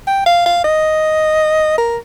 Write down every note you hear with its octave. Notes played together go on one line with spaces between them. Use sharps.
G5
F5
F5
D#5
A#4